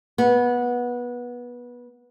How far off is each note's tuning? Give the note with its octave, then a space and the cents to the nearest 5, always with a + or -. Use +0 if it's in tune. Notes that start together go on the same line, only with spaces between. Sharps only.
B3 -20